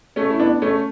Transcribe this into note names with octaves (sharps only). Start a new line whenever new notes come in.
A3 C#4
E4
B3 D4
A3 C#4